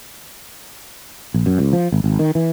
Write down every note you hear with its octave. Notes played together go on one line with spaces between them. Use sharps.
A#1
F#2
C#2
F3
G#1
G#1
D#3
E3